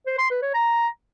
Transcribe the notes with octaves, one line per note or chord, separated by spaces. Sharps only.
C5
C6
B4
C#5
A#5